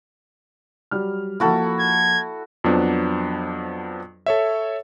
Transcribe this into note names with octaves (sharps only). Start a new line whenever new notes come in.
F#3 G3 F6
F3 A#3 E4 F#4 A4
G#6
F2 F3 F#3 B3 D4
A4 C#5 E5